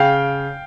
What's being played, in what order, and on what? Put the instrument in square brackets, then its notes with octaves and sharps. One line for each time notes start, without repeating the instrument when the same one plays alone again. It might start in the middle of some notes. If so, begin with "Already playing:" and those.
Already playing: [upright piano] C#3 F5 G5